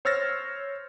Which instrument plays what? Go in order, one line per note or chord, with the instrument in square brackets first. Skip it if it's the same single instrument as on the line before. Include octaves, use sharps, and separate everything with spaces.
[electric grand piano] C5 C#5 E6 F6 A6 A#6